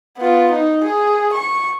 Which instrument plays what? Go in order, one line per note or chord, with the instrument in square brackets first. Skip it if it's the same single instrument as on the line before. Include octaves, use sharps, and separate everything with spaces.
[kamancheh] B3 F4
D#4
G#4
C#6